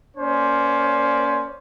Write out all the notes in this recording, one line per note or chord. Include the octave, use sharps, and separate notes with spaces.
A#3 C#4 C5 D5